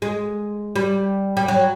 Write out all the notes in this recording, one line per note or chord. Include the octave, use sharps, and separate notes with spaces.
G#3
G3
G3
F#3